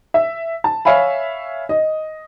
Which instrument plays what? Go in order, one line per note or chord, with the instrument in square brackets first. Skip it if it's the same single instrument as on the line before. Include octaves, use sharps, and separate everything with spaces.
[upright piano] E5
A5
C#5 E5 F5 G#5 B5
D#5